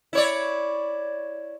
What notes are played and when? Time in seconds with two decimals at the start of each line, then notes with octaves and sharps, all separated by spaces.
0.13 E4 C#5 D5